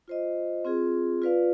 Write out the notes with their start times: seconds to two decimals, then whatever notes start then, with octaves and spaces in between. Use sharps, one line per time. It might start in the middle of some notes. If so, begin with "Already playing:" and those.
0.08 F4 C5 D#5
0.65 C4 F4 G#4
1.22 F4 B4 D5 F5